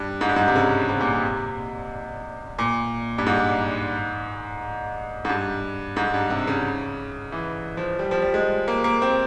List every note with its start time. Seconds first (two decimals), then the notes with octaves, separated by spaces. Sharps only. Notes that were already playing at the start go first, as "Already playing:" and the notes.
Already playing: G2
0.21 G#2
0.29 G2
0.36 G#2
0.48 C3
0.56 C#3
0.89 C3
1.01 A#2
1.13 C3
2.59 A#2
3.18 G2
3.27 G#2
5.25 G#2
5.29 G2
5.96 G#2
6.14 G2
6.30 C3
6.47 C#3
7.32 E3
7.77 F3
7.99 G3
8.11 F3
8.22 G3
8.34 G#3
8.68 A#3
8.84 A#3
9.02 C4